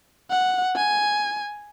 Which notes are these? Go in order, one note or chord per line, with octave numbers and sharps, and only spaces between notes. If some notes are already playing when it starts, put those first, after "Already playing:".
F#5
G#5